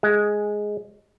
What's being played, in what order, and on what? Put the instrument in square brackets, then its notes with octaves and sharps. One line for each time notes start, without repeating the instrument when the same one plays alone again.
[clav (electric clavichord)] G#3